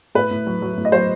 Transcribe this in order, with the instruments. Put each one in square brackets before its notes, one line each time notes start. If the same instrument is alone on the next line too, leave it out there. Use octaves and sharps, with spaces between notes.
[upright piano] A2 B4
A2
F#3
F#3
A2
D#5
F#3 C5